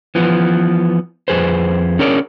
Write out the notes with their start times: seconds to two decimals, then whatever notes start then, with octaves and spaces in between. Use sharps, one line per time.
0.15 E3 F3 B3
1.28 F2 G#4 B4 C5
1.99 C#4 D4 G#4 A#4 C#5 D5